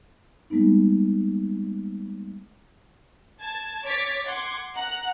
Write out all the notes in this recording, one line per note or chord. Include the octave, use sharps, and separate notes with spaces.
G3 G#3 A#3 B3 D#4
A5 G#6
C#5 D6 G#6 A6 B6
F#5 C6 D6 G#6
F#5 A#5 F#6